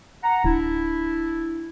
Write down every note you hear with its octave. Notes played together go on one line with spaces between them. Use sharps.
F#5 A#5
D1 D4 E4